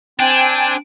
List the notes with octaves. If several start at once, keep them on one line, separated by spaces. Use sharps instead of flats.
C4 D4 G5 G#5